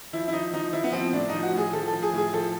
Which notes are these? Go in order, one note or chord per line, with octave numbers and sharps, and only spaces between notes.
F3 E4
E4
F3 D#4
F3 D#4
F3 E4
B3
F3 C4
A2 D4
F3 D#4
F#4
A2 G#4
F3 A4
F3 A4
G#4
A2 G#4
F3 A4